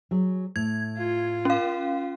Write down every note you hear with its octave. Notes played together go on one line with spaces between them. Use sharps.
F#3 G#4
A2 G#6
F4
C#4 F5